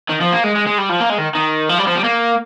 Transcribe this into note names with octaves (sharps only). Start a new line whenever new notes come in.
D#3
F3
A#3
G#3
G#3
G#3
G3
F3
A#3
G#3
D#3
D#3
F3
G3
F3
G3
A#3